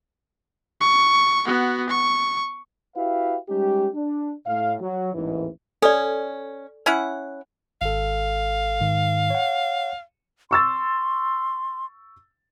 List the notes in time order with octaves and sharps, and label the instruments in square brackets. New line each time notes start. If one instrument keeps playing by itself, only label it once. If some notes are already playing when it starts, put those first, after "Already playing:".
[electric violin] C#6
B3 F#4
C#6
[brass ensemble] E4 F#4 G4 B4 E5 F5
G3 G#3 C#4 D#4 G4
D4
A2 F5
F#3
A1 D#2 G#2 E3
[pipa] C#4 [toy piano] A4 D5
[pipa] C#4 E4 F#5
[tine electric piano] G#1 A4 [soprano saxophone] F5
[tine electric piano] G#2 D#3
C#5 F#5
[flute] C6 [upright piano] C#6 E6 A6